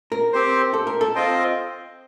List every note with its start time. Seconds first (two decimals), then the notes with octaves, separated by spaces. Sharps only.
0.12 A#4
0.33 C4 G4 C5
0.74 A4
0.87 A#4
1.01 A4
1.15 C4 F4 C5 D#5 G5